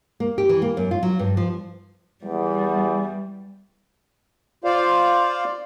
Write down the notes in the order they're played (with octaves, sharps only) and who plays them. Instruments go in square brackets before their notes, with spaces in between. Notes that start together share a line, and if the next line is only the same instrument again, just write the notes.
[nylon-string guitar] A#3
G4
E3
A#3
F#2
F4
F#3
G2
F3
[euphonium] E2 [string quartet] G3
[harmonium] F4 C5 D5 F5